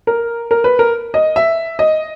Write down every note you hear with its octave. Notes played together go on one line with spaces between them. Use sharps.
A#4
A#4
B4
A#4
D#5
E5
D#5